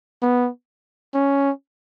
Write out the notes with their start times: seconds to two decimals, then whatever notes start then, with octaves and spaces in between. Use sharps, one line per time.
0.22 B3
1.14 C#4